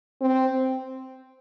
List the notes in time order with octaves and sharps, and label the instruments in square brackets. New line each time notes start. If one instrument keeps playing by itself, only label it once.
[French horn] C4